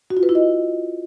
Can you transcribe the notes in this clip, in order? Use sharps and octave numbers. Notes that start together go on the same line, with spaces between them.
F#4
F4
B4
E4
D#5